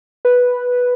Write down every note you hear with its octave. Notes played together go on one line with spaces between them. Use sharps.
B4